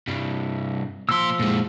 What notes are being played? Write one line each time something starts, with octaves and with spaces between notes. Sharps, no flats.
G2 C3
A#2 F3 C6 E6
A#2 G#3